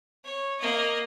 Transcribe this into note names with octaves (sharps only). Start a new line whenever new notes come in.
C#5
A#3 D#5